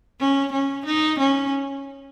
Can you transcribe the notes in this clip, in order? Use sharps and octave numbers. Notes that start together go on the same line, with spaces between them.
C#4
C#4
D#4
C#4